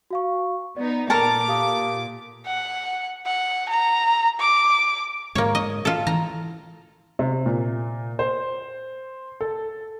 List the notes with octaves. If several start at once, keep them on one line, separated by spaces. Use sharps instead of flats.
F#4 F5 C#6
B3 D#4 D5
A#2 A4 A#4 A#5 D6
G4 F5 D#6
F#5
F#5
A#5
D6
G#2 A#3 C#5
D#5
F4 A4
E3 A#5
C3
A#2
C5
A4